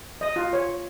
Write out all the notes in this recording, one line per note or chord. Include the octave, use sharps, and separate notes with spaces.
D#5
F4
C#5